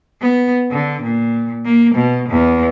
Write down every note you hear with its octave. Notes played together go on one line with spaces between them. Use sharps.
B3
D3
A#2
A#3
B2
E2